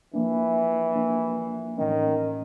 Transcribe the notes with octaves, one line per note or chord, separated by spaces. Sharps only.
E3 F3 A#3 D4
F3 A#3 D4
A2 D#3 E3 A3 C#4